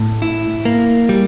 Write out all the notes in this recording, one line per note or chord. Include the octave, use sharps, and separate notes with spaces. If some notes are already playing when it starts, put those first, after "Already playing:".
Already playing: A2
E4
A#3
G3